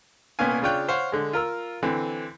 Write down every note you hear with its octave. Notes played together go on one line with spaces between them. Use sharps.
C2 A#2 B3 C#4 F5 G#5
C#3 D4 F4 C#5 G5 F#6
C5 C#5 F5 F#5
D3 G#3
F4 A#4 E6
D3 E3 C4